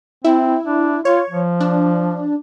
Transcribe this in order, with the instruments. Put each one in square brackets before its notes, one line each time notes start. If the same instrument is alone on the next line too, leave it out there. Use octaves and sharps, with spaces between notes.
[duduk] C4 [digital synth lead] E4
[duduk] D4
[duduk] F4 [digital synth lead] C#5
[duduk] F3
[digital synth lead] D4